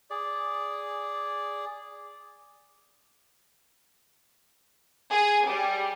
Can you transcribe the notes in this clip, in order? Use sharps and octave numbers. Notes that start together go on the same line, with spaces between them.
G#4 D5
G#4
G3